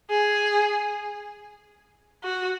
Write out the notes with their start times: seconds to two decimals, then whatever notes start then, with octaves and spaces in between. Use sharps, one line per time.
0.10 G#4
2.24 F#4